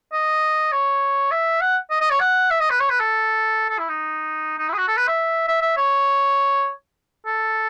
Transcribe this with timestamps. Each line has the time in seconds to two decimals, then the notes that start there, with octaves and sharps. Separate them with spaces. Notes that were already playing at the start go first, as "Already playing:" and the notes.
0.13 D#5
0.72 C#5
1.31 E5
1.61 F#5
1.90 D#5
2.01 D#5
2.11 C#5
2.20 F#5
2.51 E5
2.60 D#5
2.70 B4
2.80 C#5
2.90 B4
3.00 A4
3.69 A4
3.79 E4
3.89 D#4
4.58 D#4
4.69 E4
4.73 G#4
4.78 F#4
4.88 A4
4.98 B4
5.08 E5
5.48 E5
5.62 E5
5.77 C#5
7.26 A4